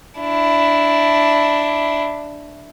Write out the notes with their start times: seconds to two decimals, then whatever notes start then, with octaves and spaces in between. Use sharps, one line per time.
0.20 D4 E4